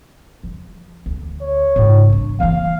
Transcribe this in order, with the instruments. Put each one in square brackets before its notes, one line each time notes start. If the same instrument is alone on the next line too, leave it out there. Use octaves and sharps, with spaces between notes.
[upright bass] F3
D2
[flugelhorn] C#5
[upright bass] G#2 C#3
C#4 D4
[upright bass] E3 A#3 [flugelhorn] F5